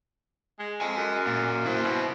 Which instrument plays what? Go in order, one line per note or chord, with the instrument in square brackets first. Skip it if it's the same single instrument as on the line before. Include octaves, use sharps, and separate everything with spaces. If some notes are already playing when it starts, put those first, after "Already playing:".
[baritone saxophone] G#3
[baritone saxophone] F2 [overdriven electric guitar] D#5 G#5
[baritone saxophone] F#2
[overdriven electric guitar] A#2
E4 C5
[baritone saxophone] B2